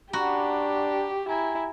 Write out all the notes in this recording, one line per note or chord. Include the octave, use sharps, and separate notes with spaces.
D4 F#4 G4 A#5 B5
E4 G#5 A#5 G#6